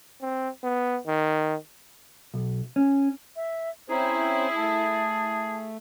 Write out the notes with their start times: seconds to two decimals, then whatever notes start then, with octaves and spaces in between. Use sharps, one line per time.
0.22 C4
0.64 B3
1.07 D#3
2.34 B1
2.76 C#4
3.36 E5
3.90 C4 C#4 E4 G#4 C5 A#5
4.56 A3 A5